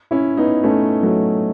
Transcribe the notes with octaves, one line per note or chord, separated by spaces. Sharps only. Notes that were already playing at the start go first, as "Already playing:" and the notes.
C#4 E4
B3 D#4
A3 C#4
F#3 A3